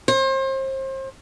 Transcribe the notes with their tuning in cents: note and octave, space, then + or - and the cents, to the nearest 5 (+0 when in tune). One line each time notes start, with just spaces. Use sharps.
C5 +35